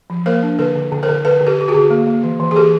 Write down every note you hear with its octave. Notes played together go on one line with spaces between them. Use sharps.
F3
A#3 A#4 C5
D4
D3 A4 B4
D3
D3
A#4 C5
D3
D3 A4 B4
D3
G4 A4
D3 G4
F#4 G#4
D3
A#3
A#3
E3
E3
G#4
E3 G4 A4